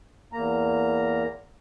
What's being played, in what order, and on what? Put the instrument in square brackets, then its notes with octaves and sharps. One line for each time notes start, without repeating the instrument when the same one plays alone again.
[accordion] E2 A#3 A#5